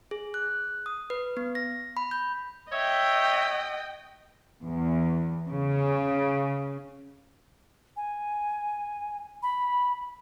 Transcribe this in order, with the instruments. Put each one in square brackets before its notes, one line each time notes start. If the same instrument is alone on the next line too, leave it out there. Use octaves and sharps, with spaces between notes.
[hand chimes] G#4
F#6
D#6
B4
B3
A#6
B5
G6
[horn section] C#5 E5 [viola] D#5 G5
[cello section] E2
C#3
[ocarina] G#5
B5